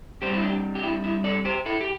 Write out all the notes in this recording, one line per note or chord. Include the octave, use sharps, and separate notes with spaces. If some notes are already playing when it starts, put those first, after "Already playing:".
G2 G3 C4 G4 C5
E4
D4 G4
G4
E4
E4
A4 D5
G4 C5
E4 A4
G4